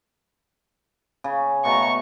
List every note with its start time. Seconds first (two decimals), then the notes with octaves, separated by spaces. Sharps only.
1.24 C#3
1.65 B2 A3 A#5 C#6